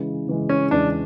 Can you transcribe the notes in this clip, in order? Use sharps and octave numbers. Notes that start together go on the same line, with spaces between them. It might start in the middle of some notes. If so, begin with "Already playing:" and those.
Already playing: C#3 E3 G#3
C#3 E3 G#3
C#4
E2 C#3 E3 G#3 D4